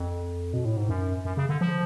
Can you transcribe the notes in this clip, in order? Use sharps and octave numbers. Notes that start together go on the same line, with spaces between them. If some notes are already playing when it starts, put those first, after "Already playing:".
Already playing: F2
B2
A2
G#2
F#2
F#2
C#3
D3
F3